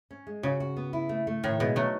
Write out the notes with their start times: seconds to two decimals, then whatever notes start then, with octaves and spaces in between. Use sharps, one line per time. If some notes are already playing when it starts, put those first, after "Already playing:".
0.11 C#4
0.27 G#3
0.43 C#3 F#4
0.60 F#4
0.77 B3
0.93 E4
1.09 A3
1.27 A3
1.43 A2 D#3
1.60 B2 G#3
1.76 F#3 A3 D#4